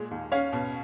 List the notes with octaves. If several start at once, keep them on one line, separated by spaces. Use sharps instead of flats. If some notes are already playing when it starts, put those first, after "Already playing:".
Already playing: A#2 G#3
D#2
C#4 C#5 F5
B2